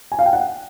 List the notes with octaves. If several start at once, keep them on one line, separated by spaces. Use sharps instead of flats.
G#5
F5
G5
F#5